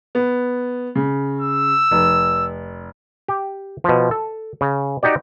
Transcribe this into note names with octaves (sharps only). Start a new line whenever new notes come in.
B3
C#3
E6
F1
G4
B2 F3
A4
C#3
D#4 F#4 G4 D5